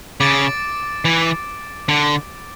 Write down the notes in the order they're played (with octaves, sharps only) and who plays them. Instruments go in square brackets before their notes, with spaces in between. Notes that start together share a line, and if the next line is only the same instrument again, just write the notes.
[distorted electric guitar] C#3 [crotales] D6 A6 D7
[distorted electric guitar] E3
D3